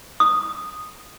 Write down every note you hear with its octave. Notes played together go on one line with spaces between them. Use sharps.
D#6